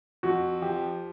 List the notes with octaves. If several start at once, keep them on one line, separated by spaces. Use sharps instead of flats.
F2 F#4
F3 G4